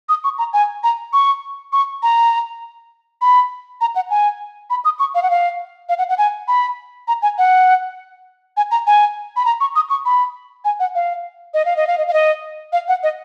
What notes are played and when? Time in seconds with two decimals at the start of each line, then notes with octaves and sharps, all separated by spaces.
0.09 D#6
0.24 C#6
0.38 A#5
0.53 G#5
0.83 A#5
1.13 C#6
1.73 C#6
2.03 A#5
3.21 B5
3.81 A#5
3.96 F#5
4.10 G#5
4.70 B5
4.85 D#6
4.99 C#6
5.15 F5
5.23 F#5
5.30 F5
5.89 F5
5.98 F#5
6.09 F#5
6.18 G#5
6.48 B5
7.08 A#5
7.22 G#5
7.38 F#5
8.57 G#5
8.71 A#5
8.87 G#5
9.36 B5
9.45 A#5
9.61 C#6
9.76 D#6
9.90 C#6
10.05 B5
10.65 G#5
10.80 F#5
10.95 F5
11.54 D#5
11.65 F5
11.77 D#5
11.87 F5
11.98 D#5
12.08 F5
12.13 D#5
12.73 F5
12.88 F#5
13.03 D#5